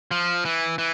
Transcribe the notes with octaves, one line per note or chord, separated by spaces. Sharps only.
F3
E3
E3